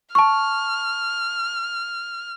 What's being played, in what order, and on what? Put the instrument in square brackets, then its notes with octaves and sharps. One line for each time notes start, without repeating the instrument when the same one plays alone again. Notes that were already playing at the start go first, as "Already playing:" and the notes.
[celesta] A5 C#6 [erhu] F6